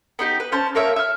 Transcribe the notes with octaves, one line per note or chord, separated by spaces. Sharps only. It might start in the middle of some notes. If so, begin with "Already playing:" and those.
B3 D#4 G4
B4
C#4 C5 A5
A#3 A#4 C#5 E5
E5 F6